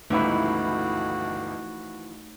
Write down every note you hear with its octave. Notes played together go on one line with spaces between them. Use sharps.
G1 C#2 E3 F3 A3 D#4 E4 F#4